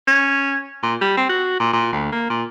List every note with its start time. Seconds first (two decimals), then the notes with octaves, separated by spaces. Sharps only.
0.07 C#4
0.83 A#2
1.01 G3
1.17 C4
1.30 F#4
1.60 A#2
1.73 A#2
1.93 D2
2.12 A#3
2.30 A#2